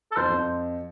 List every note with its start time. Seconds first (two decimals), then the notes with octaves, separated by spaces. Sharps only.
0.12 A4
0.16 F2 F3 C5
0.30 F2 F3